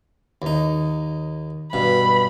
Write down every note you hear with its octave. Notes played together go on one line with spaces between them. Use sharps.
D#2 D#4
G2 B2 B5